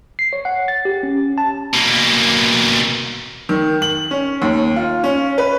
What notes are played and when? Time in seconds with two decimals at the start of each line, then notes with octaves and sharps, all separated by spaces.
0.19 C7
0.33 C#5
0.45 F#5
0.68 A6
0.85 G4
1.03 C#4
1.38 A5
1.74 B2 A#3
3.49 D#3
3.82 F#7
4.11 C#4
4.42 D#2
4.76 F4
5.04 C#4
5.38 B4